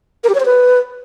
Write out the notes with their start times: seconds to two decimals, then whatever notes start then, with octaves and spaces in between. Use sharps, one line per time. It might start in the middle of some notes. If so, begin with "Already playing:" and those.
0.24 A#4
0.29 G4
0.35 C#5
0.40 C5
0.45 B4